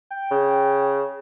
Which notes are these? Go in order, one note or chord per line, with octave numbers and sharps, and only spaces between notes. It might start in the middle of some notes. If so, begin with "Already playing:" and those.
G5
C#3